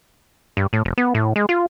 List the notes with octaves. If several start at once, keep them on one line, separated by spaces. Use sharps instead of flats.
G2
A2
F1
B3
A2
G#3
F4